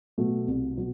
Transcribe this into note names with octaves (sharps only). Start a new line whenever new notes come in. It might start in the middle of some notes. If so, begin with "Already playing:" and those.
B2 F#3 A3
C2
B2 F#3